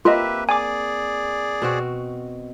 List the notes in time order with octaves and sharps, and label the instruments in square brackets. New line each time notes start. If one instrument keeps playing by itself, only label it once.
[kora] A#3 C4 [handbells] F4 D#5 [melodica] G4 B4 E5
[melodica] G#4 D5 [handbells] G#5 D6
[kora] B2 C4 F#4